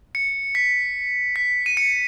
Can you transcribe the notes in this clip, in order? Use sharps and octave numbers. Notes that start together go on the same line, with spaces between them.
C#7
B6
B6
D#7
C#7